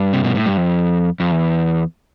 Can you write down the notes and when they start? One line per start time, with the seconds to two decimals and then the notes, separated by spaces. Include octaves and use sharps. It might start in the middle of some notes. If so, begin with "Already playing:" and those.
Already playing: G2
0.13 C3
0.24 B2
0.35 A2
0.46 G2
0.57 F2
1.20 F2
1.31 E2